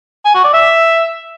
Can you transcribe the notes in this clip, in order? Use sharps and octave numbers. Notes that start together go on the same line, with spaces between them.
G#5
F#4
D5
E5